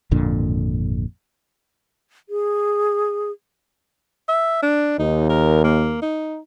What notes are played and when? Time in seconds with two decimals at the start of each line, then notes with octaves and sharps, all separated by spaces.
0.11 G#1 F2 A#2 D3
2.29 G#4
4.29 E5
4.62 D4
4.99 D#2 D#4
5.30 A#4
5.64 A#3
6.02 D#4